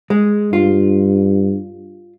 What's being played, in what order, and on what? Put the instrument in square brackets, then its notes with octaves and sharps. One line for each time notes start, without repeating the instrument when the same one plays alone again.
[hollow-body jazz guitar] G#3
[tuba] G2 [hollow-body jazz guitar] F4